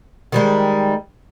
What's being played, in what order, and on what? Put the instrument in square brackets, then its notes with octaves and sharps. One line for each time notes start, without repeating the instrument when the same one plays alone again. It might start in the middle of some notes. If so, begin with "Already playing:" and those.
[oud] D#3 G3 G#3